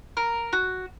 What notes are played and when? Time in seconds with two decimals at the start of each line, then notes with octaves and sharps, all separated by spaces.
0.17 A#4
0.53 F#4